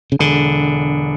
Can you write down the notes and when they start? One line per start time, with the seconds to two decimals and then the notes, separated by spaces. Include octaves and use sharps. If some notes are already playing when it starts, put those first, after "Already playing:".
0.12 C#3
0.19 E1 D3